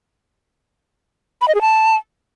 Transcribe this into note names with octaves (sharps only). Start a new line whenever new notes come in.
B5
D#5
G#4
A5